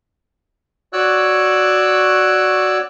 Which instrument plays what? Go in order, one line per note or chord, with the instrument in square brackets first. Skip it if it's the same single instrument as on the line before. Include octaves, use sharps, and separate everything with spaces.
[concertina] F#4 C#5 D5 E6 F#6